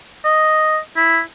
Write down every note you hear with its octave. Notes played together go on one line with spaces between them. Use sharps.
D#5
E4